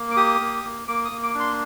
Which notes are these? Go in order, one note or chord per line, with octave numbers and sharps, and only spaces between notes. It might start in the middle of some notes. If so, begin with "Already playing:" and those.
Already playing: A#3
D6
G4 D#6
A#3
A#3
A#3 D6
D#6
A#3
D6
D4
C6